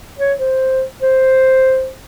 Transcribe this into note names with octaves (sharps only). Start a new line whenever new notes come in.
C#5
C5
C5